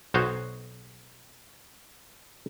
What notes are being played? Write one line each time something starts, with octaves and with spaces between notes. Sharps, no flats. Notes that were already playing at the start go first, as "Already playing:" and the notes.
B1 F#4 C5 C#5 D#5